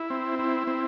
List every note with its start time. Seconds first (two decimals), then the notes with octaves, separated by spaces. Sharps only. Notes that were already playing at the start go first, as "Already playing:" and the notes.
Already playing: E4
0.10 C4
0.39 E4
0.67 C4